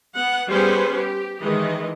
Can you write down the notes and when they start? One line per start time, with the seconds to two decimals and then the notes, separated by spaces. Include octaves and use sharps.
0.16 B3 F#5
0.50 G3 B3 C#4 G#4 B4 C5
0.97 G4
1.40 D#3 E3 G#3 D#5